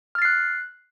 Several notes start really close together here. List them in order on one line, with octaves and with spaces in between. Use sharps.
F6 A6 C7 F#6